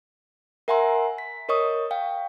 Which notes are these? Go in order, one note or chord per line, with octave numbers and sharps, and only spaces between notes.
A#4 E5 F#5 G#5 A#5 C6
B6
A#4 C#5 D#5 C#6 D#6
F5 G5